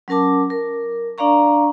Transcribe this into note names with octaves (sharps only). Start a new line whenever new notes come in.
F#3 C#4 A#4 A5 D6
A#4
D4 D5 F5 A#5 C#6